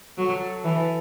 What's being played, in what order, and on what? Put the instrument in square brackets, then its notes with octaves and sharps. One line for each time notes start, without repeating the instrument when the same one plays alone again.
[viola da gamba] F#3 [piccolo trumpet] A4
[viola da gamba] E3